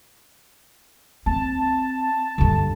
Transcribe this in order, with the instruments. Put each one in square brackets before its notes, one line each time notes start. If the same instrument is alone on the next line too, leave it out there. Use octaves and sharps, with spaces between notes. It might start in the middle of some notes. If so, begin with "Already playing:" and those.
[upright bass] C4 [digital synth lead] A5
[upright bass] G2 D3